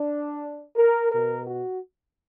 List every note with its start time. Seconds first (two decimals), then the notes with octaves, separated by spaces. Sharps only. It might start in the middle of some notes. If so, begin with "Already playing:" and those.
Already playing: D4
0.76 A#4
1.12 B2 A#4
1.47 F#4